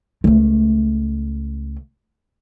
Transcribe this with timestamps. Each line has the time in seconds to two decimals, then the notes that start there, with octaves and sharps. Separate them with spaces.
0.24 C#2 A3